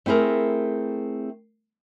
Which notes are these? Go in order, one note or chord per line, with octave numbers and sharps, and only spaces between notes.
A3 C4 E4 G#4 A#4